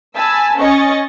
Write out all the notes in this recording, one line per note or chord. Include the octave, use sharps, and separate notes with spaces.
G#5 A5 B5 E6
C#4 D#5 C#6 A6